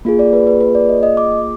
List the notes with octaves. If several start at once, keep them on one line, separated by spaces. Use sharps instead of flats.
A#3 F4 G#4
D5
B4
B4
B4
D5
D#5
D#5
D6